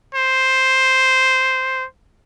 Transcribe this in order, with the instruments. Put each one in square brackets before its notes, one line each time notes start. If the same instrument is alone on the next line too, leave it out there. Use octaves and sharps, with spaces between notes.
[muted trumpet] C5